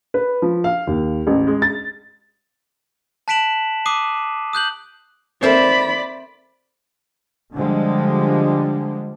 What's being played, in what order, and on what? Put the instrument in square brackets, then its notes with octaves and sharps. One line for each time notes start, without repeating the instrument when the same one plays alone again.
[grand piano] B4
F3
F5
D#2
A1
G#3
A6
[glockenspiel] A5 F#6 B6 D7 E7 F#7
D6 D#6 F#6 C7 D#7
D#6 F#6 G6 F#7
[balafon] C4 A4 A#4 [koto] C5 E5 [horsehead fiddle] D5 B5
[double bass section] D3 F3 G3 G#3